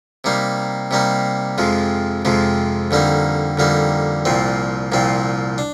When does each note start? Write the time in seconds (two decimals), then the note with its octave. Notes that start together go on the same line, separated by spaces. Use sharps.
0.24 C3 G3 A#3 D#4
0.91 C3 G3 A#3 D#4
1.58 F2 C3 F3 G#3
2.25 F2 C3 F3 G#3
2.91 F2 D3 G3 A#3 D#4
3.58 F2 D3 G3 A#3 D#4
4.25 C2 A#2 F3 C4
4.92 C2 A#2 F3 C4
5.58 D4